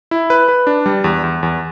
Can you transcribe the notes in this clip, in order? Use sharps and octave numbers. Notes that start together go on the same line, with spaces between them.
E4
B4
B4
D4
G3
E2
E2
E2